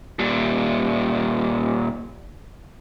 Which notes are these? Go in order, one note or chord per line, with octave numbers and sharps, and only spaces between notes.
A#2 G3